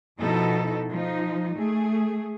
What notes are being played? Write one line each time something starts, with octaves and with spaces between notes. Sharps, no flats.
B2 F3 D#4 E4 A4
F3 D#4
A3 G#4